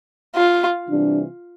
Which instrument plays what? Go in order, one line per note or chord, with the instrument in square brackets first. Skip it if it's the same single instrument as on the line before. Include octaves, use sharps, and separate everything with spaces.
[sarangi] F4
[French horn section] C3 E3 G3 D4